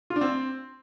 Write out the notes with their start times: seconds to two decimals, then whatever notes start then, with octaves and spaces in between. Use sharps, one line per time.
0.10 F4
0.16 D4
0.21 C4